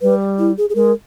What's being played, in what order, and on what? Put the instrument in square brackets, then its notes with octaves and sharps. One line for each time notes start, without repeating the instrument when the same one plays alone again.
[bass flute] G3 [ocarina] B4
[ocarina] E4
G#4
G#4
[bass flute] G#3 [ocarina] A#4